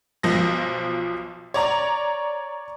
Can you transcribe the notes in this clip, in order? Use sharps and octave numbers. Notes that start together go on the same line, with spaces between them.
B1 F3 A#6
C#5 D5 A#5